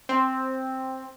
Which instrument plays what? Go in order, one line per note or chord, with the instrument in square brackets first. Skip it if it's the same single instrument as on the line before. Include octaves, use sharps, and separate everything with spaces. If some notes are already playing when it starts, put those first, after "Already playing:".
[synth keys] C4